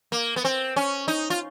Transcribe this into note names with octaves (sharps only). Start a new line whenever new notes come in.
A#3
B3
C4
C#4
D#4
F4